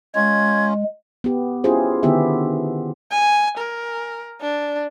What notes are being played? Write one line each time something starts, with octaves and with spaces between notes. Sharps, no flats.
G#3 C#4 F4 G#6
B3 G4
C#4 E4 F4 G4 G#4 C5
D3 D#3 B3 E4 G4 E5
G#5
A#4
D4